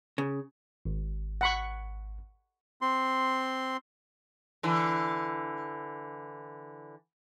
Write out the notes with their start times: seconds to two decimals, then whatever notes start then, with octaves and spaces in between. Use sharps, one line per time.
0.18 C#3
0.86 G#1
1.41 F#5 B5 C#6
2.82 C4 C6
4.63 D3 E3